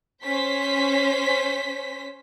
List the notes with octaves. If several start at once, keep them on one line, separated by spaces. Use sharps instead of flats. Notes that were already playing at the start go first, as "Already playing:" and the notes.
C#4 C5 B6